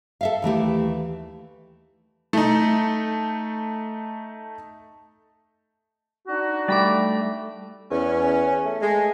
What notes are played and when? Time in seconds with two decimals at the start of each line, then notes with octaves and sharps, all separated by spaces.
0.21 A4 E5 F5
0.42 D#2 E3 A3 G4
2.33 A3 D#4
6.27 D4 D#4 F#4
6.68 G3 A3 D5 B5 D6
7.91 E2 C#4
8.65 A3
8.81 G#3